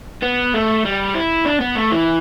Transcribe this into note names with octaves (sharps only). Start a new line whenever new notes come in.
B3
A3
G3
E4
D4
B3
A3
E3